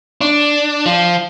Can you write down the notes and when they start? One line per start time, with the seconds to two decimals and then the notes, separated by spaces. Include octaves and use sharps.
0.21 D4
0.86 F3